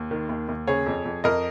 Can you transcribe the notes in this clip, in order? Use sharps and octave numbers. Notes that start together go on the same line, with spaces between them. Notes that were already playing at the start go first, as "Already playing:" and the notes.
Already playing: D#2
D#3
D#2
D#2
C#3 G#4 C#5
F2
F2
F2 A#4 D#5